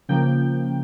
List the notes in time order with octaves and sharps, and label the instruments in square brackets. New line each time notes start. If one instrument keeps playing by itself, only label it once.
[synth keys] C#3 F3 A#3 G5